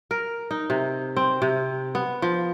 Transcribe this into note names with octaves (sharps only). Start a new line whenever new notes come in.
A#4
D#4
C3
C4
C3
B3
F3